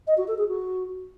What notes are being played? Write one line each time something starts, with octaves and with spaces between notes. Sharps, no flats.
D#5
F#4
A4
G#4
F#4